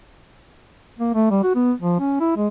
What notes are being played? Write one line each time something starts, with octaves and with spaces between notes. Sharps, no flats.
A#3
A3
G3
F#4
B3
F3
C#4
E4
G#3